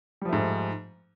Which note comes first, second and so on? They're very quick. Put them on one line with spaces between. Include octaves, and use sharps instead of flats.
G3 F3 A3 G#2